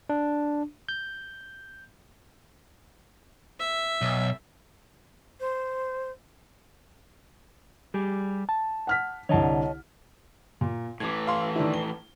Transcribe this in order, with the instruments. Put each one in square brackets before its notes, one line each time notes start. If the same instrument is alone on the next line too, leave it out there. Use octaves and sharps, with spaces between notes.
[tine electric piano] D4
G6
[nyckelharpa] E5
[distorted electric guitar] B1
[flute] C5
[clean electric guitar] G3 G4 G#4
A5
[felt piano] F#5 F6 B6
[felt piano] C2 D3 [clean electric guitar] C#5 D#5 A5
[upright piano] A#2
[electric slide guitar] A2 E3 [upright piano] D6 G#6
[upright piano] F5 C6
D#3 D4 E4
G7